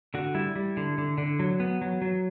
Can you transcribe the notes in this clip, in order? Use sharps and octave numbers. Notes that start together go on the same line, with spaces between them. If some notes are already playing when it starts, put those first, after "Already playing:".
D3 F#4
G3 E4
G3
D3
D3
D3
F#3
B3
F#3
F#3